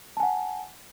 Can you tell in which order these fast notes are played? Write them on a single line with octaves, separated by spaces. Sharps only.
A5 G#5 F#5